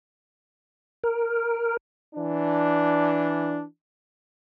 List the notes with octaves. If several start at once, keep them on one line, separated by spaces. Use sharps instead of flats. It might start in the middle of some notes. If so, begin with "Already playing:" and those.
A#4
E3 D4